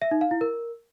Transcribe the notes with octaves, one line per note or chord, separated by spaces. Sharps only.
E5
D#4
F5
E4
A#4